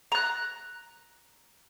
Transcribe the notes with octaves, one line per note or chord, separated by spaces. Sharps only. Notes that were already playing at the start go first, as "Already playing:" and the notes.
A#5 F#6